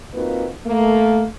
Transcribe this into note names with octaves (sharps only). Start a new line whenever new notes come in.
A#3 C4 D#4 F4 F#4 B4
A3 A#3